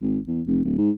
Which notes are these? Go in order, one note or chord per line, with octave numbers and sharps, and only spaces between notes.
G#1
E2
F1
D1
G#2